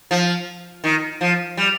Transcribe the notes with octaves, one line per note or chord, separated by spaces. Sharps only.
F3
D#3
F3
G3